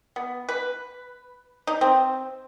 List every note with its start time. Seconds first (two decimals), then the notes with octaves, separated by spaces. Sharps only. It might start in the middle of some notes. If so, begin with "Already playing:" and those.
0.16 B3
0.49 B4
1.67 D#4
1.81 C4